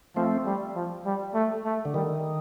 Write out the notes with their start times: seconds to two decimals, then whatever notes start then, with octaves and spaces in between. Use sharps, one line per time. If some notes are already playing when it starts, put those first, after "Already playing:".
0.16 F3 A3 C4
0.46 G3
0.76 F3
1.06 G3
1.34 A3
1.65 A3
1.85 D3
1.93 D#3 G3